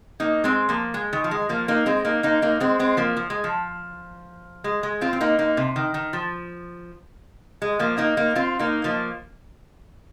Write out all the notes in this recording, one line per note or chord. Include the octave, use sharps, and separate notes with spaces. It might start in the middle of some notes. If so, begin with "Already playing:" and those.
A#3 D#4
G#3 C4
F3 A#3
G#3
D#3
F3
G#3
F3 A#3
A#3 D#4
G#3 C4
A#3 D#4
A#3 D#4
A#3 D#4
G#3 C4
G#3 C4
F3 A#3
F3
G#3
F3
G#3
G#3
C4 F4
C4
A#3 D#4
A#3 D#4
C3
D#3
D#3
F3
G#3
F3 A#3
A#3 D#4
A#3 D#4
C4 F4
A#3 D#4
F3 A#3